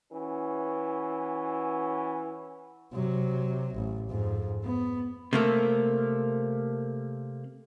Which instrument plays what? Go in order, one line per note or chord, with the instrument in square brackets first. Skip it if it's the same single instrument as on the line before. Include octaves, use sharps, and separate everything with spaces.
[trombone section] E3 C#4 F#4
[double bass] C3 F#3
A1
F2 G#2
B3
[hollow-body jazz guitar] C3 A3 A#3